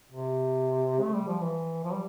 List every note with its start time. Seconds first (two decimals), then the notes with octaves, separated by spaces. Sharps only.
0.11 C3
1.02 A3
1.15 G3
1.28 F3
1.41 E3
1.84 F3
1.93 G3